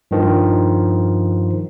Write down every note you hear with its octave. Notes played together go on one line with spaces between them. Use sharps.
G2 D#3 F3